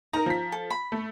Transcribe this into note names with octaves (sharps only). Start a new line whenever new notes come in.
D#4 A#4 A#5
F3 B6
A4
B5
A3